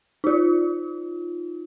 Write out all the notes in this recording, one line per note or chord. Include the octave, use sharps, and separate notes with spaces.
D#4 F4